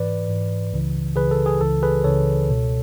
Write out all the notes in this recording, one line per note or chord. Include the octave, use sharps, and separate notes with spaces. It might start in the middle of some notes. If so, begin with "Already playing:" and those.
Already playing: G#2 E3 B4 D5
G#2 E3
C#2 C#3 E3
C#2 C#3 E3 G#4 B4
A4
G#4
C#2 C#3 E3 A4
G#4 B4
C#2 C#3 E3 A4 C#5
C#2 B2